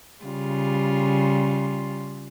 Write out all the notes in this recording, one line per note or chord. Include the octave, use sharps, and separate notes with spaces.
C#3 G3 F4